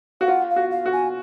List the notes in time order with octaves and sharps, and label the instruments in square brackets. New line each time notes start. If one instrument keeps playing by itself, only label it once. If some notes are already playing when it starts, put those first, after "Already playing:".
[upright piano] F#4 [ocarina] F5
[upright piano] F4 [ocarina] F#5
[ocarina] F5
[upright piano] F#4
[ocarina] F5
[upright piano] F#4
[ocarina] G#5